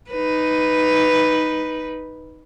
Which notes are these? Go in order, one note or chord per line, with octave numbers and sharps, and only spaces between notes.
D#4 B4